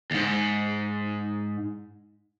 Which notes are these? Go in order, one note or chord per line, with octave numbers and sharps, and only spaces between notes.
D#2 G#2